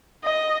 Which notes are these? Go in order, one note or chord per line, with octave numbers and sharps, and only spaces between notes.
D#5